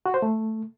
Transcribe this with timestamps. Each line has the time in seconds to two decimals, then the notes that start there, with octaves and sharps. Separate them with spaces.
0.06 F#4
0.14 C5
0.22 A3